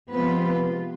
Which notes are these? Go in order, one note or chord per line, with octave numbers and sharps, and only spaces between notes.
C3 F3 G#3 B3 C4 F4 B4